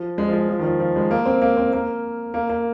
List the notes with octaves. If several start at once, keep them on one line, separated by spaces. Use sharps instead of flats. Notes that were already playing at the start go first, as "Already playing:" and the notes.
Already playing: F3
G#3
F3
G#3
F3
D#3
F3
F3
G#3
A#3
C4
A#3
C4
A#3
A#3
A#3